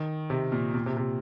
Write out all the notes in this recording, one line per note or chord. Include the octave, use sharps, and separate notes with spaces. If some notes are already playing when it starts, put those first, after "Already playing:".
Already playing: D#3
C3
A#2
A#2
C3
C3